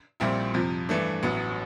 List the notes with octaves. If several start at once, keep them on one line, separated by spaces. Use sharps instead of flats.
A#1 A#2 G3 C4 E4
F2 C3 F3
G2 E3 A3 D4
A1 A2 F#3 B3